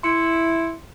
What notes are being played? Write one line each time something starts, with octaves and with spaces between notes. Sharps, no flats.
E4 C6 C#7